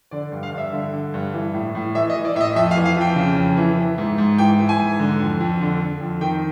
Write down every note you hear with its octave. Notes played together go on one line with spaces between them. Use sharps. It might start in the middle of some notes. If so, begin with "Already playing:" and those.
D3 D5
G2
F5
G2 E5
D3
D3
G2
E3
A2
A2
E3 E5
D#5
E3
D5
A2 D#5 E5
F2 E5
F5
E3
F5
F2 G5
C#3
F2
E3
E3
G#2
G#2
E3 G5
E3
G#5
G#2
D3
F2
F2
D3
D3
F2
D#3 G5